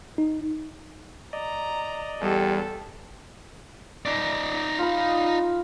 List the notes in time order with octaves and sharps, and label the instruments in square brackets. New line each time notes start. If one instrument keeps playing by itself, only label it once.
[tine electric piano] D#4
[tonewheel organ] D5 D#5 [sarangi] A#5
[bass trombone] E2 [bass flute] G3 [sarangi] A4
[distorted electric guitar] D#4 D5
[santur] F4 B5